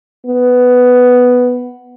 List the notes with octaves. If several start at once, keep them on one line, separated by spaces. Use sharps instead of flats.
B3